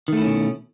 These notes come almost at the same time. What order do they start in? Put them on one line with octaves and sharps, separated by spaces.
D#3 A3 E4 C#4 B2